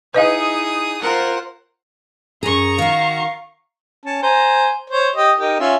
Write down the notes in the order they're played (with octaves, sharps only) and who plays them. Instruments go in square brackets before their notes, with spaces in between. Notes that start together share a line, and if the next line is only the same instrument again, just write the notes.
[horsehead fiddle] D#4 E4 [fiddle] G#4 D#6 [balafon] B4 D#5 F5
[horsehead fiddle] F4 A#4 [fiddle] C5 F#5
[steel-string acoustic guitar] F#2 G#4 [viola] A#5 C#6
[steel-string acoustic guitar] D#3 F#4 [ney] F5
[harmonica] C#4 A5
C5 G#5 A#5
C5 C#5
G4 D#5
D#4 G4 A#4
C#4 F4 E5